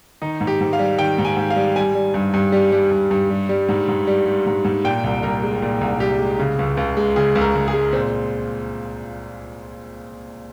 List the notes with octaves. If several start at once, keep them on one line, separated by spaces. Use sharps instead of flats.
D#3 D#4
G#2
G4
G#2
F5
G3
D#3 G5
G#2
G#5
G#2
F5
G3
G3 G#5
G3
G2
G2
G3
G3
G2
G2
G3
G3
G#2
G#2
G3
G3
G#2
G#2
A#2 G5
C2
C2 A#4
G#3
A#2
C2
C2 G4
G#3
C#3
C#2
C#2
G#3
C#3 G#4
C#2
A#4
C#2
G#4
G#3
A#2 C4